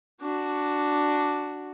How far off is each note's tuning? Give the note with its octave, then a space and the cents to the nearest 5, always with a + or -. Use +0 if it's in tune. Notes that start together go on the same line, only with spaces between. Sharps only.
D4 +0 F#4 +0